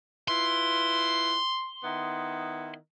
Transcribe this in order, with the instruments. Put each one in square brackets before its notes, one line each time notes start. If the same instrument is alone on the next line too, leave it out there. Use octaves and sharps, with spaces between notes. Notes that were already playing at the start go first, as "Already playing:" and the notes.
[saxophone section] E4 F4 B4 [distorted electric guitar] C6
[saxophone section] D#3 B3 E4